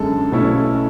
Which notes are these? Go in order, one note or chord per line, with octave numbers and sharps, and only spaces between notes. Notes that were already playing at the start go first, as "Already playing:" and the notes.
Already playing: F#2 D3 G#3 C#4 A4
B1 B2 A3 C#4 E4